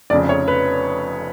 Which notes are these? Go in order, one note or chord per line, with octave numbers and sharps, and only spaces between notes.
F1 F2 C#3 D5
C#5
B4